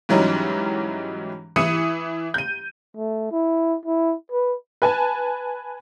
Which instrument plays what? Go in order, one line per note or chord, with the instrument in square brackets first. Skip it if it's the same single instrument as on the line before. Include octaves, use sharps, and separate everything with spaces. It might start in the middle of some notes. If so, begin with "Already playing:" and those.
[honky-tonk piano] G#2 E3 F#3 G3 C#4 D#4
E3 E4 D#6 C#7 D#7
G6 D#7
[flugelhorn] A3
E4
E4
B4
[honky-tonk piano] B4 G#5 A5